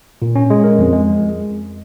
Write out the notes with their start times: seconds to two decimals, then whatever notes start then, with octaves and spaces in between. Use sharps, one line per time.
0.22 A#2
0.36 C#4
0.50 G#3
0.64 A#4
0.79 F2
0.93 G#3